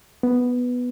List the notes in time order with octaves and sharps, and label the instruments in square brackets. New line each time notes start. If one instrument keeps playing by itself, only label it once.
[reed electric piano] B3